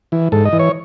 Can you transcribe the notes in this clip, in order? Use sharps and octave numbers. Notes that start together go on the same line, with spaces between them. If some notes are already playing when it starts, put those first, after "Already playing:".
E3
G#2 A4
D#5
E3
C#5